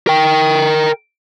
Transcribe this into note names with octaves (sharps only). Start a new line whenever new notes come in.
A#4 G5